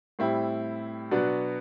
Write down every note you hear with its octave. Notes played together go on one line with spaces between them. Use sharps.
A2 G3 C4 E4
B2 F#3 B3 D4 F#4